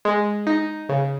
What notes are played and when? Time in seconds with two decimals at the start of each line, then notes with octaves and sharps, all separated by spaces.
0.05 G#3
0.47 D#4
0.89 C#3